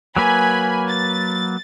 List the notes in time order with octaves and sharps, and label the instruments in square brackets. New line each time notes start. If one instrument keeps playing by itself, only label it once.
[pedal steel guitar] F#3 A#3 B4 [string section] G#5 B5
[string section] A6